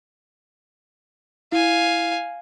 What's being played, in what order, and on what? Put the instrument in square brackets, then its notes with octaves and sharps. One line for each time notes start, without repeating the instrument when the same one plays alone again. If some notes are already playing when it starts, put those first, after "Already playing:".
[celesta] E4 [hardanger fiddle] F5 G#5